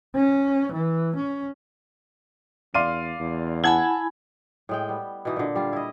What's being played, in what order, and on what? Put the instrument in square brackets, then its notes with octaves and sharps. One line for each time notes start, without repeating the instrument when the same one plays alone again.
[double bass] C#4
E3
C#4
[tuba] E2 [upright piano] D5 F5 [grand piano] C6 F6 D#7
[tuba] E2
[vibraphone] E4 G#5 B5 [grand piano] F#5 [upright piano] A5 G#6 F#7
[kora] A2 G#3 G5
G3 B3
B2 E3 D#4
A#2 D3
G3 F4
E4 D#5